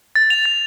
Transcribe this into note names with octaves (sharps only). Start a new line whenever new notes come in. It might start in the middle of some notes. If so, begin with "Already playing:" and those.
A6
F7
A6